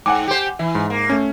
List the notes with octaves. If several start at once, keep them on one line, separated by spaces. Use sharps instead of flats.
G#2 F#5 G#5 D6
G4 C5
E3 E4
G#2
A#3
A3 C#4